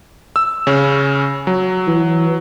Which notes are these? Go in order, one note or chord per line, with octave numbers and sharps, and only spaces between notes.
E6
C#3 C#4
F#3
E3